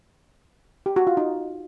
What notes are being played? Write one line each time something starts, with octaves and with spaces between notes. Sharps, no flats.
G4
F#4
F4
D#4